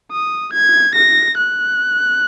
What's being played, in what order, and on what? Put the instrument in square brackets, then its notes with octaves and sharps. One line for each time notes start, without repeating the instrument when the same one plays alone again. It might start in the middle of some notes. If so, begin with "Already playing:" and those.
[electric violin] D#6
G#6
A#6
F#6